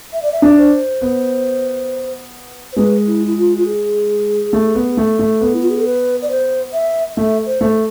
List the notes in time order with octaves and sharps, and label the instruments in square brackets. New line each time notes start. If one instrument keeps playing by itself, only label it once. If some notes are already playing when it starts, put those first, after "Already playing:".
[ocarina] E5
D5
E5
[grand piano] D4
[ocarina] C5
[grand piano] B3
[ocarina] C5
[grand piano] G#3 [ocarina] B4
[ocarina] E4
E4
F4
F4
G#4
[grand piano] A3
B3
A3
A3
[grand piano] B3 [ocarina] A4
[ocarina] E4
F4
G#4
A4
B4
D5
C5
E5
[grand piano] A3 [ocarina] E5
[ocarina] C5
[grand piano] A3